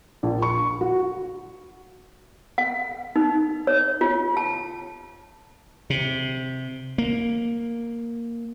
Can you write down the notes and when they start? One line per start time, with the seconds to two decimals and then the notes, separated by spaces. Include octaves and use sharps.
0.23 A#1
0.42 C#6
0.81 F#4
2.58 F#5
3.16 D#4
3.67 C#5
4.01 F4
4.37 A5
5.90 C3
6.98 A#3